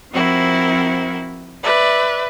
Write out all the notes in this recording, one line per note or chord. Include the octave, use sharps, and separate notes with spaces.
F3 C4 E4 F#4 A#4
B4 D5 E5